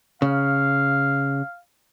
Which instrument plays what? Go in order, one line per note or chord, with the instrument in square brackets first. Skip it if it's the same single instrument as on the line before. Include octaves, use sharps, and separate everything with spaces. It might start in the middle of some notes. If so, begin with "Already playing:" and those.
[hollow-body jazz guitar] C#3 [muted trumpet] F5